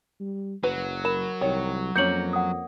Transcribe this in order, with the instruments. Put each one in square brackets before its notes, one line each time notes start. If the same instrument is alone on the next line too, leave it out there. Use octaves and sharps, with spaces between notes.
[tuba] G3
[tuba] F#1 [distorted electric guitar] F#3 [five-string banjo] B4
[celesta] A#4 E7 [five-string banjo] B5
[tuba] C2 [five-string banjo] D#3 C#5
[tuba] F2 [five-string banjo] A#3 C#4 [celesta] G6 C#7 F#7
[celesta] F#5 D#6